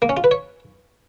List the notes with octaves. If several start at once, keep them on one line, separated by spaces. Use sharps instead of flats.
A#3
C#4
F4
B4
C#5